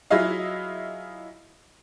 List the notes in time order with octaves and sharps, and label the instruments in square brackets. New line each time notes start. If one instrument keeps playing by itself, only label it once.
[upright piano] F#3 E4 F4 G#4 D#5 F5